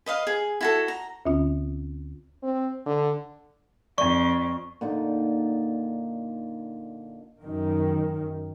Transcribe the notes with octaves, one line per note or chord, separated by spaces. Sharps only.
B4 D#5 F5
G#4
E4 F#4 A4
A#5
D2 D3 C#4 F4
C4
D3
F2 D5 C#6
A#2 D3 D#4
F#2 D#3